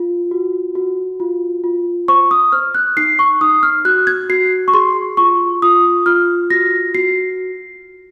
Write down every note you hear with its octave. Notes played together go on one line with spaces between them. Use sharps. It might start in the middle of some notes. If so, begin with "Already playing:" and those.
Already playing: F4
F#4
F#4
F4
F4
C5 C#6
D#6
C5 F6
F#6
D#4 C7
C#6
D#4 D#6
F6
F#4 F#6
G#6
F#4 C7
C#6
G#4 C6
F4 C#6
F4 D#6
F4 F6
F#4 A#6
F#4 C7